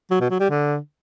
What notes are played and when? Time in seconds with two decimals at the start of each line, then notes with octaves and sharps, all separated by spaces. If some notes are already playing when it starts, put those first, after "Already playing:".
0.11 F#3
0.20 B2
0.30 F#3
0.40 G3
0.49 D3